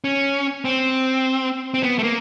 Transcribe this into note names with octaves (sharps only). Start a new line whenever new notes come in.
C#4
C4
C4
B3
A3
A#3